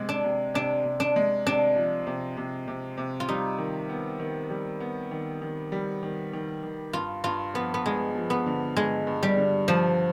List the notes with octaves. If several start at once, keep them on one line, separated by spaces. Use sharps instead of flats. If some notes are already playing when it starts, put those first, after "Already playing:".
Already playing: C3 G#3
D4
C3
C3 D4
C3
D4
G#3
C3 D4
F3
C3
C3
C3
C3
F4
G3 D#4
D#3
B3
D#3
G3
B3
D#3
D#3
G3
D#3
D#3
D#3
G2 F4
G2 F4
F3 B3
B3
G2 G#3
F3
B3
D3
G2 G#3
G2
G3
D3
G2 F3